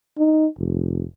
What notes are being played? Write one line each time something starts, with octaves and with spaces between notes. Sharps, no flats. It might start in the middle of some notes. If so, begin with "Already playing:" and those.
D#4
F1